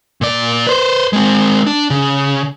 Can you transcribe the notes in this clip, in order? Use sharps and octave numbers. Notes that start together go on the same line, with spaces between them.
A#2 D5
B4 C5
G#3 C4
D4
C#3